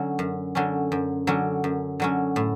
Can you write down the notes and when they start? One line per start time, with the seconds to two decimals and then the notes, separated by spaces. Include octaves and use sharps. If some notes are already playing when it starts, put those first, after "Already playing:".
Already playing: D3 F#3 C#4
0.19 F#2
0.55 D3 F#3 C#4
0.92 F#2
1.27 D3 F#3 C#4
1.64 F#2
2.00 D3 F#3 C#4
2.36 A2